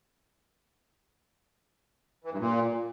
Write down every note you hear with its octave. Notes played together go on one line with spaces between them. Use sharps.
E3
G2
A#2